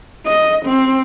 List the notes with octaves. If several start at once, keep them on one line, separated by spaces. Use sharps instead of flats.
D#5
C4